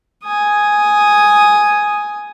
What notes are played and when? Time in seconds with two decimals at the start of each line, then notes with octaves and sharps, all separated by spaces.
0.24 G#5 D#6